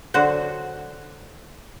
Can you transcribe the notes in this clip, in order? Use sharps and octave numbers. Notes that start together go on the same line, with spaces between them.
D3 F#3 F#4 C5